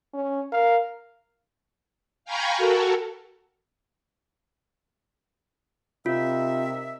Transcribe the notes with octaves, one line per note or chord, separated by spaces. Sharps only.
C#4
A#4 F5
F5 G5 G#5 A#5 B5 C#6
F#4 A4 A#4
C3 D#4 F4 A#4 E5